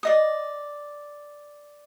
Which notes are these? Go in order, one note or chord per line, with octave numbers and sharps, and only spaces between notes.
D5 D#5 D#6